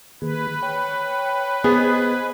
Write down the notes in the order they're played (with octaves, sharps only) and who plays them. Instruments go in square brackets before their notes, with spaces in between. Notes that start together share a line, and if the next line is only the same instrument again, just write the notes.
[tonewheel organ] D#3 A#3 G#4 [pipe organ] B4
[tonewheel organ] C#5 G5
[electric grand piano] B3 [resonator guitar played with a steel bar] G#4 [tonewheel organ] C5 D#5 G#5